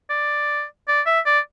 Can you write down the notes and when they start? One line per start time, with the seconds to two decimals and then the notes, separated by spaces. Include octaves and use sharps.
0.10 D5
0.88 D5
1.06 E5
1.25 D5